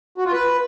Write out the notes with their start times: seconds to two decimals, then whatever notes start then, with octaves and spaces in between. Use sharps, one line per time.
0.18 F#4
0.25 F4
0.32 B4